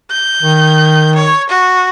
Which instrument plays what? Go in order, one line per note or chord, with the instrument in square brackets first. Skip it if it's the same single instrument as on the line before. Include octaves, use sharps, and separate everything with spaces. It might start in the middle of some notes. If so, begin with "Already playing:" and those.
[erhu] G6
[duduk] D#3
[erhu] C#5
F#4